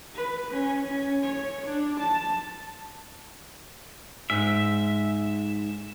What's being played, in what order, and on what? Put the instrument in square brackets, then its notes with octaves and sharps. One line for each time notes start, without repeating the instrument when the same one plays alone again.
[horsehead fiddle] B4
C#4
C#4
C#5
D4
A5
[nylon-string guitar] G#2 [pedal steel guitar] E5